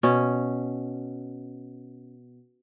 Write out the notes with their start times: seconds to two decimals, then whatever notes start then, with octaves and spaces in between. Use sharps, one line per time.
0.03 B2 C#4